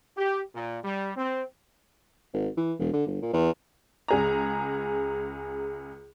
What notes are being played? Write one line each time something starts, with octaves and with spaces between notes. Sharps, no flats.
G4
A#2
G3
C4
G#1
E3
E1
D3
G1
A#2
E2
C#2 G#4 A#5